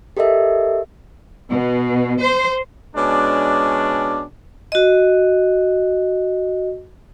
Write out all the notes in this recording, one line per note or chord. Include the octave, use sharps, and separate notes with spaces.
G4 A4 A#4 D#5 E5
B2
C5
B2 G#3 C#4 D4
F#4 D#5